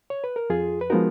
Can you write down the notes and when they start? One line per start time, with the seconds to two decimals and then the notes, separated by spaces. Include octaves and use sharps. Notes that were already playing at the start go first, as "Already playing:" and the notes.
0.10 C#5
0.24 B4
0.36 A#4
0.50 F2 F4 G#4
0.81 B4
0.90 F3 G#3 B3 D#4 F#4 A#4